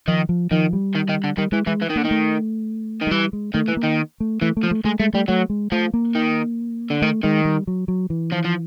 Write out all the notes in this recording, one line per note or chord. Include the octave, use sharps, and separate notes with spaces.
D#3 F3
F3
D#3 F3
G3
D#3
D#3
D3
D#3 G3
E3 G#3
E3 G#3
E3
D#3
D3 A#3
D#3
A3
D#3
G#3
E3 G3
G#3
D#3 A3
E3
A#3
D#3
A3
E3 A3
A3
F3
A3
G#3 A3
G#3 A3
G3 A3
F#3 A3
G#3
F3 A3
A#3
D#3
D3
D#3 A3
D#3 G#3
G3
F#3
F#3
E3
F3
F3